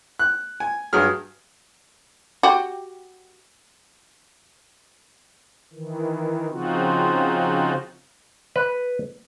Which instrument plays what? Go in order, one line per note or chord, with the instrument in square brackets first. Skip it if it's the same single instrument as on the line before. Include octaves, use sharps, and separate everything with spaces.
[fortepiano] F#6
G#5
G2 F#3 G#4 F6
[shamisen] F#4 G4
[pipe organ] D#3 E3
C#3 F3 C4 D#4 F4 F#4
[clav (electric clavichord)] B4